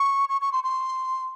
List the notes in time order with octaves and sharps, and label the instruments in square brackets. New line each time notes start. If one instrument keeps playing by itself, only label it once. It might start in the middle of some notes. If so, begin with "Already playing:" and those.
Already playing: [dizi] C#6
C#6
C#6
C6
C6